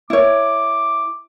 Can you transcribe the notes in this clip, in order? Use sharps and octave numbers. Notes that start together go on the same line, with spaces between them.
E4 C#5 D6